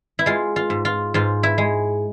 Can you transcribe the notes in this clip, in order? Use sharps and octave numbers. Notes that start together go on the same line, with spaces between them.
E4
G#3 F4
F4
G#2
F4
G#2 F4
E4
G#3